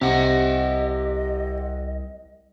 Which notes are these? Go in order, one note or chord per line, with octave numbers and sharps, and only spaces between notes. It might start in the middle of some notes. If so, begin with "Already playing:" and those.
C2 C3 G4 D#5 F#5